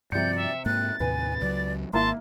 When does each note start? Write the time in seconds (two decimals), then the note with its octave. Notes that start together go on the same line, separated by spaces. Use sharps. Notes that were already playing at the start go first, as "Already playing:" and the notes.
0.12 G2 C3 F3 D5 G6 C#7
0.36 E5
0.66 G#2 A#3 F#6 A6
1.00 D#2 A2 C3 B4 G#5
1.41 C#2 F#3 D5
1.93 G#1 A#3 E4 A5 C6